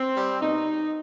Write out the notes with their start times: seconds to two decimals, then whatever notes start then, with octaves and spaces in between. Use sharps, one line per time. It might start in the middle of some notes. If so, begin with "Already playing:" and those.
Already playing: C4
0.16 G3
0.41 B2 D#4